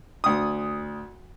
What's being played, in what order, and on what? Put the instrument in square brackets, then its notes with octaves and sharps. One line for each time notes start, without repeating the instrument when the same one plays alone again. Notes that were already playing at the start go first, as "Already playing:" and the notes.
[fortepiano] D2 D#6